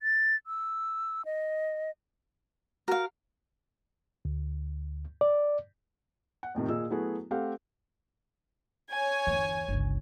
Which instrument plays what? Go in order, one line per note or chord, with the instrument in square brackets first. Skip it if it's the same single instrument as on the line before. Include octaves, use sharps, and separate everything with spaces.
[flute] A6
E6
D#5
[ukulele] F#4 F#5 [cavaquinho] A#4 F5
[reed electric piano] D2
D5
[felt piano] F#5
F2 A2 C3 D#3
A#2 G#4 D#5 E6
F#3 A3 B3 E4 F#4 G#4
A3 C4 G4 A4 F5 F#5
[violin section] C#5 G#5
[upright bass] G1 E2
G1 C#2